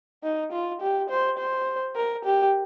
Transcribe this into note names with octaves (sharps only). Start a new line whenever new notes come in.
D#4
F4
G4
C5
C5
A#4
G4